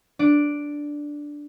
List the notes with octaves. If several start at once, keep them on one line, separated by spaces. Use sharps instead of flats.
D4 D7